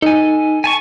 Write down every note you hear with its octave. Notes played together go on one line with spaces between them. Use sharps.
D#4 A4 G#5
G#5 A5 C#6